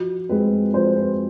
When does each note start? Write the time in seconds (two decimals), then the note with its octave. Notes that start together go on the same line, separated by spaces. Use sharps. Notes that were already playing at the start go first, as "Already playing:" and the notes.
Already playing: F3 F#4
0.29 G#3 C4 B4
0.74 F3 C5
0.97 B4